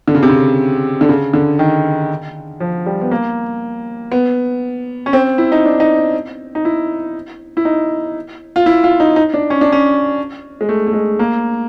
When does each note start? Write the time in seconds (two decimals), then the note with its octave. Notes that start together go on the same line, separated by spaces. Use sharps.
0.08 D3
0.15 C#3
0.23 C3
0.30 C#3
1.01 D3
1.09 C#3
1.33 D3
1.59 D#3
2.60 F3
2.86 G3
3.01 B3
3.11 A#3
4.12 B3
5.06 C#4
5.13 C4
5.38 E4
5.52 D#4
5.65 D4
5.80 D#4
6.55 D#4
6.65 E4
7.57 E4
7.65 D#4
8.56 F4
8.66 E4
8.84 F4
9.00 D#4
9.16 D#4
9.34 D4
9.50 C#4
9.61 D4
9.72 C#4
10.61 G#3
10.69 A3
10.87 A3
10.93 G#3
11.19 A#3